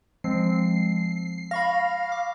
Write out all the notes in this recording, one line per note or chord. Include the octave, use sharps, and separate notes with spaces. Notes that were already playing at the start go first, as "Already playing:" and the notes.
F3 G#3 C4 C7
F5 B5 C#6 A#6
D6